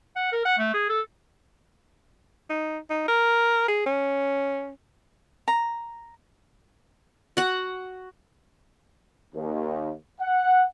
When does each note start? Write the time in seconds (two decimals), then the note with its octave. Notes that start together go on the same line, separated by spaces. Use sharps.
0.16 F#5
0.32 A#4
0.45 F#5
0.58 A3
0.74 G#4
0.89 A4
2.50 D#4
2.90 D#4
3.08 A#4
3.68 G#4
3.86 C#4
5.48 A#5
7.37 F#4 F#5
9.35 D#2
10.20 F#5